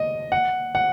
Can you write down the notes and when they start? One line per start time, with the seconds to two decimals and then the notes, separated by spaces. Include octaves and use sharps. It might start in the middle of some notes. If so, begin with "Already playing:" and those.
Already playing: D#5
0.32 F#5
0.75 F#5